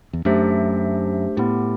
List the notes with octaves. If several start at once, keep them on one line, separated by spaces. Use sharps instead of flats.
E2
F#2 A3 D4 G4 C5 E5
A2 B3 E4 G4